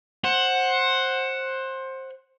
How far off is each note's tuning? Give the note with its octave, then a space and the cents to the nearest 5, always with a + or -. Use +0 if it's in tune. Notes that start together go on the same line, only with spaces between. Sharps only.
C5 +20 F#5 +0